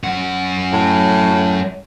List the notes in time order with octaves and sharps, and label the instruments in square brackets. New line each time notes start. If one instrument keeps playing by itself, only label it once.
[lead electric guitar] F#2 F#5
[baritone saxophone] A2